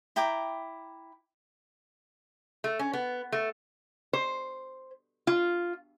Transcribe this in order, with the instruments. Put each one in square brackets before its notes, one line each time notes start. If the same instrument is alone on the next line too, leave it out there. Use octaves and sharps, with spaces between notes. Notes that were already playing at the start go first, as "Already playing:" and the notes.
[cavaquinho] E4 G5 A#5 D6
[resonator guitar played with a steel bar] A3
C#4
B3
A3
C5
F4